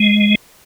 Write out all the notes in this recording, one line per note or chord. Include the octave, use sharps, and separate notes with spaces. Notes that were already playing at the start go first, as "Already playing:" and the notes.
Already playing: G#3